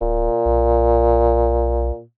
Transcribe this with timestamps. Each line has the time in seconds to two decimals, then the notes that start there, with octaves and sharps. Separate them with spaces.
0.01 D1 A#2
0.46 B1